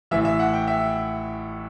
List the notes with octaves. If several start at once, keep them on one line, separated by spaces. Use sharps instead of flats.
A1 A2 E3 E5
E5
F#5
G5
E5